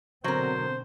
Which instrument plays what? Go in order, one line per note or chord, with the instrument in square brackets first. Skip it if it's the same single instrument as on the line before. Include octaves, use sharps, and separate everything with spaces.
[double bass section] B2 D3 C4 [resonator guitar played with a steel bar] F#3 A#4 [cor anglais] C5